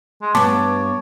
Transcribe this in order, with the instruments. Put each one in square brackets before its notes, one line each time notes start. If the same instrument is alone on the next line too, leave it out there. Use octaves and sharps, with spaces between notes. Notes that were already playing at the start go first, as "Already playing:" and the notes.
[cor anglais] G#3
[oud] G2 B3 [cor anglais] C#5 [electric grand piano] A5 D6